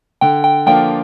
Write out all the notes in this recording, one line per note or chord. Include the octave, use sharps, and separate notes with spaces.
D3 G5
G5
F3 A#3 D4 F4 G5